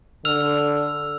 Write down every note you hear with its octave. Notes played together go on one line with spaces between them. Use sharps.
D3 E6 F6 F7